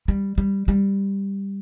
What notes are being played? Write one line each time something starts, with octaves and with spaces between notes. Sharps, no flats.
G3
G3
G3